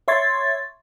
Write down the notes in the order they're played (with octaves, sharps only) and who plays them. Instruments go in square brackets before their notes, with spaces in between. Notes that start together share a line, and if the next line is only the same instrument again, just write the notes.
[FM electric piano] C#5 E5 C6 C#6 G#6 A6